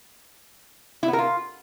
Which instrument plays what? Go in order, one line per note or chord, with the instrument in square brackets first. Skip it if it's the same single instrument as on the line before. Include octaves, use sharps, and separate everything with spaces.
[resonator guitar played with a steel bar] E4
B3
A#4
F4